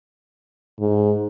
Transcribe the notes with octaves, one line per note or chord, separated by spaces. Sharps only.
G#2